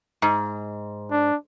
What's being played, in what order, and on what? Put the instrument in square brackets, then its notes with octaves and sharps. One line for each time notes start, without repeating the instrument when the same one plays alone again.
[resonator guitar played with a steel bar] G#2
[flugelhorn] D4